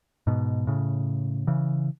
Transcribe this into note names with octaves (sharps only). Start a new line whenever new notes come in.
G#2 B2
A2 C#3
C#3 E3